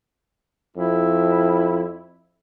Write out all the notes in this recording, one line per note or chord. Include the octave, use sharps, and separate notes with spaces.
F2 E4